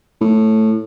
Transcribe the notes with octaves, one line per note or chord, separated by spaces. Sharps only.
A2